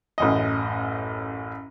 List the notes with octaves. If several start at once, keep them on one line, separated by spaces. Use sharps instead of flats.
A1 F#2 D#5